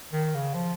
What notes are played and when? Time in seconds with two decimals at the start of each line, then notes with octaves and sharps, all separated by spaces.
0.13 D#3
0.35 C#3
0.54 F3